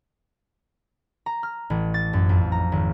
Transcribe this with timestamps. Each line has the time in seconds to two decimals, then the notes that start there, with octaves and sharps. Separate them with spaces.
1.26 A#5
1.43 F6
1.70 A1
1.94 A6
2.13 F#2
2.29 F2
2.52 A#5
2.72 G#1